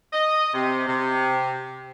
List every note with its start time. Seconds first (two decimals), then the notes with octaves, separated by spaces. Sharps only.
0.13 D#5
0.54 C3
0.87 C3